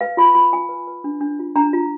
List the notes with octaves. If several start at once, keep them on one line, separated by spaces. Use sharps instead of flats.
B4 F5
F4 B5
F4 B5
F4 G#5
B4
B4
D4
D4
F4
D4 A#5
F4